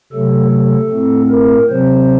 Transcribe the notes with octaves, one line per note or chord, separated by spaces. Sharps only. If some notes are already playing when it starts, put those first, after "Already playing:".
C3 F#3 A3 A4
A4
A2 A3 C4
A#4
C3 F#3 C4 C5